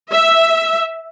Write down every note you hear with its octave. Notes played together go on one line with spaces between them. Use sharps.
E5